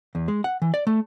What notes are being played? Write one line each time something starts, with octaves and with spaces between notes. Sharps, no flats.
E2
G#3
F#5
E3
D5
A3